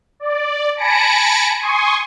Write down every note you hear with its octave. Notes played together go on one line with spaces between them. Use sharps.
D5
G#5 A5 B5 A#6 C#7 D7
G#5 C6 C#6 D#6